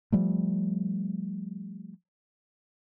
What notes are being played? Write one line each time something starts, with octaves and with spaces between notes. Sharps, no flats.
F3 G3 A3